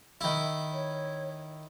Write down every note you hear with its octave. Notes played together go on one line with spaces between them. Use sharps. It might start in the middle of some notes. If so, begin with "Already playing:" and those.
D#3 E4
C#5